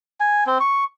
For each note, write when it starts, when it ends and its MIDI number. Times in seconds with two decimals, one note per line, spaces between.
0.20 0.44 80
0.47 0.58 60
0.60 0.84 85